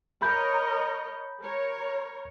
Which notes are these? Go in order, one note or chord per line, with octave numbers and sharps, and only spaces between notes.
A#4 C#5 D#5 B5 G6
A#4 C#5